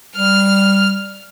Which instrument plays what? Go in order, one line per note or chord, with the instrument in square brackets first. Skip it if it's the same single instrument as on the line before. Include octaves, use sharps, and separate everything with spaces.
[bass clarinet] G3 [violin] F6